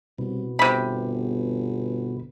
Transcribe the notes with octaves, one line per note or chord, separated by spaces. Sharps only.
C2 B2
G1 C3 B5